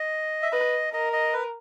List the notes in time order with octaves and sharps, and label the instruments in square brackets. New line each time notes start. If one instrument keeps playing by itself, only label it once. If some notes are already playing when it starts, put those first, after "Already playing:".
Already playing: [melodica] D#5
E5
[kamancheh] B4 [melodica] D#5
[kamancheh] A#4 [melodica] D#5
[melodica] D#5
B4